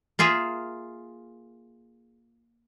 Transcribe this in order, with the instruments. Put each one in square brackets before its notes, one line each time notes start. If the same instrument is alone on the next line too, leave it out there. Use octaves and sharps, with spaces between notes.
[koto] A#3 F4 G#4 E5